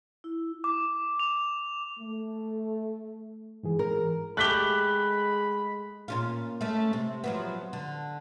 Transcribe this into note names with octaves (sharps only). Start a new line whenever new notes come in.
E4
D6
F7
A3
G#2 E3 G#4
A#4
G#3 A3 G4 B5 F#6 B6 G7
A#2 C#4 F4
A3 C#4
C3
F3 F#3 B3
D3